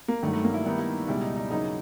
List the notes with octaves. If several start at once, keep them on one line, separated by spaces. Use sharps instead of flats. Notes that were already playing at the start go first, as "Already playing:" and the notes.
A#3
G2 D#3 F#3 A3
A3
A#3
E4
D#3 G3 B3 D#4
E4
C#2 B2 G3 E4
D#4
D#4
D#2 C#3 F#3 D#4